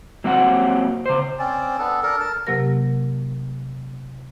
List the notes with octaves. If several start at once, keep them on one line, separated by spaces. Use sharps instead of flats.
F#3 A#3 C4 F#4 C#5 F#5
C#3 C5
C4 C#4 D5
B3 D4 A4
D4 A4 A#4
A#4 A5
C3 F#3 A#3 G4 A#4 A#6